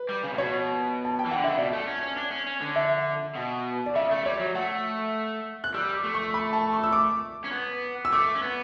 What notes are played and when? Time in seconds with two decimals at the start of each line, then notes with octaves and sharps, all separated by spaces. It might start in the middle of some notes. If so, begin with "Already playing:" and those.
Already playing: B4
0.09 G3
0.24 C#3
0.33 A2
0.38 B2 C#5
1.05 A5
1.19 G5
1.26 E3
1.31 F#5
1.37 D3
1.44 C#3 E5
1.58 B2 D5
1.73 A3
1.87 C#4
2.02 C#4
2.17 D4
2.31 C#4
2.47 C#4
2.61 D3
2.76 E5
3.36 B2
3.86 D5
3.95 C#3 E5
4.11 A3
4.25 G3 C#5
4.40 F#3
4.55 A3 F#5
5.64 F#6
5.74 G3 E6
5.94 D6
6.04 A3
6.14 C#6
6.34 B5
6.53 A5
6.73 C#6
6.84 E6
6.93 D6
7.45 C#4
7.52 B3
8.05 E6
8.12 A3 D6
8.35 C#4
8.42 B3